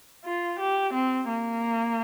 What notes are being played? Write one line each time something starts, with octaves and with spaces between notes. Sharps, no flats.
F4
G4
C4
A#3